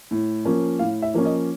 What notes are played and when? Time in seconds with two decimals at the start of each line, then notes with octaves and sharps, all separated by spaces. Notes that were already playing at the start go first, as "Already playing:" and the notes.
0.11 A2
0.45 F3 A#3 C#4
0.79 A2 F5
1.02 E5
1.14 F3 A#3 C#4
1.25 D#5